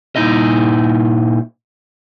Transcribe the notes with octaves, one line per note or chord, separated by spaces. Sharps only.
A#2 D#4 E4 D#5